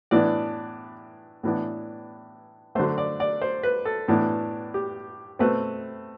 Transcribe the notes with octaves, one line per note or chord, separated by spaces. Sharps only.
A2 E3 B3 D4 D5
A2 E3 B3 D4
D3 F#3 A3 C5
D5
D5
C5
B4
A4
A2 E3 B3 D4
G4
B2 A3 C4 B4